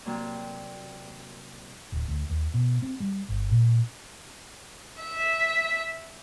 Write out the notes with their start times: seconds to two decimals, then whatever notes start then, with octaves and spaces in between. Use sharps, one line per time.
0.05 C3 F#3 A#3 D4
1.92 D1
2.08 D2
2.29 D#2
2.54 B2
2.82 C4
3.00 G3
3.28 G1
3.51 A#2
5.01 E5